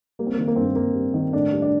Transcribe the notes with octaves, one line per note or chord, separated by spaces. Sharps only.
G3 A#3
C4
D#3 A#3
A#3
G2 C4
A#3
G2 A#3
G3
D#3
A2 D4
G3
D4